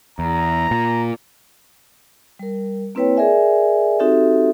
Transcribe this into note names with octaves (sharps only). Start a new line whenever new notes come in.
E2 A#5
A#2
G3 A#4
A#3 C4 E4 B4 C#5 G5
G#4 A#4 D5 E5 G#5
C4 D#4 F#4 G4 A4 E5